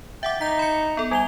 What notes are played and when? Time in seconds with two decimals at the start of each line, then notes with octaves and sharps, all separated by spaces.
0.23 E5 F#5 G5 D6
0.41 D#4 G6 B6
0.59 B5 C#7
0.97 B3 A4
1.11 G3 G#5 F7 G7